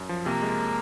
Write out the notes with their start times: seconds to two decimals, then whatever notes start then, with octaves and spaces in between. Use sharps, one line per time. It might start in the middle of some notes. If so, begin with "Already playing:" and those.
Already playing: F#2
0.09 F3
0.25 C3 A#3
0.42 G#3